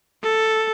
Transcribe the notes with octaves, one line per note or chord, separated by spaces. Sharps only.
A4